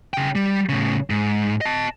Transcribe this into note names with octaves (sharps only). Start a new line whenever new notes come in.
C#3 G5
G3
A2 C#3
G#2
D#5 A5